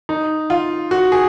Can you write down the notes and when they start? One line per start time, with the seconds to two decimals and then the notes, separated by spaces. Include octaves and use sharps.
0.09 D#4
0.50 F4
0.91 F#4
1.12 G#4